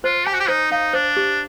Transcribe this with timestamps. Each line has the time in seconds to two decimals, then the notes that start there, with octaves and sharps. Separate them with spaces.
0.04 F4 C5
0.27 G4 G#5
0.34 F#4
0.40 G4
0.48 D#4 C5
0.71 D#4 F5
0.93 D4 C5
1.17 G4